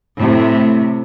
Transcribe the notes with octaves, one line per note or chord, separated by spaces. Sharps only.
A2 C3